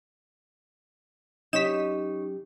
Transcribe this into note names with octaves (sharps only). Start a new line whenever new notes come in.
F#3 C#4 D#4 G4 C#5 B6 E7